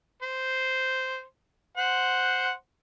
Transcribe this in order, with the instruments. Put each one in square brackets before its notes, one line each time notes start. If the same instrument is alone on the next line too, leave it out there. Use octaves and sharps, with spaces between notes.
[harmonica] C5
C5 F#5